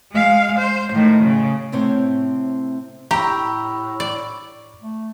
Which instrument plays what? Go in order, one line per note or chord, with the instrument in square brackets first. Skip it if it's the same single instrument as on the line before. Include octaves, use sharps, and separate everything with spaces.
[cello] G#3 F5
C5
A2 D#3
C#3
[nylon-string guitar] A2 C3 C4 C5 C#5
[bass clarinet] A2 [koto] G4 [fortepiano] A#5 [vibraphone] B5 C#6 E6
[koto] D5
[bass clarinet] A3